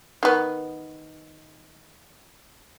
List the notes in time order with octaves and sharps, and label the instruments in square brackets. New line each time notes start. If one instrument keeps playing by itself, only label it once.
[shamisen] D#3 B3